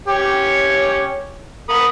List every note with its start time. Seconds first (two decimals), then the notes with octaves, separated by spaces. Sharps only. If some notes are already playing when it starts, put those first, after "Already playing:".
0.07 C#4 G4 C#5
1.69 A#4 B5 D#6